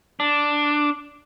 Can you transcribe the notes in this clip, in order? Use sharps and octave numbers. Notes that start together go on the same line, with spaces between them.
D4